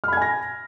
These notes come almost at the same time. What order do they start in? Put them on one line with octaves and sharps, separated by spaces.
F6 B5 G#6 G#5 A#6